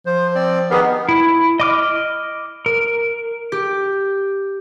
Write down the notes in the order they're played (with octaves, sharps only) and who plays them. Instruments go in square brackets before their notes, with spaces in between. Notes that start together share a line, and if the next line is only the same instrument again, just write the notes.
[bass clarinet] F3 [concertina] C5
[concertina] C4 D5
[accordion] D#3 B3 [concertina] G4 G#4 A#4
[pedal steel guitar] E4
D#5 D6 F6
A#4
[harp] G4